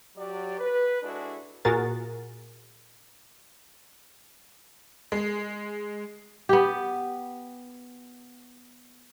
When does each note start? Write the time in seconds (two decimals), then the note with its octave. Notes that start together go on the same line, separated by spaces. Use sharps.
0.16 F#3 G4 D5
0.59 B4
1.03 G#3 D4 E4 F#4 G#4 A4
1.65 A#2 F#4 G#4 A#4 A6
5.12 G#3
6.49 B3 G4